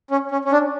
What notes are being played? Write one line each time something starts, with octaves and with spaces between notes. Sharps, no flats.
C#4
C#4
C#4
D4